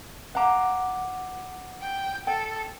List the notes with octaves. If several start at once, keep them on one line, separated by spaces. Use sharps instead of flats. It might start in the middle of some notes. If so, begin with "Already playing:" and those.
F5 F#5 A#5 D6
G5
A4 G5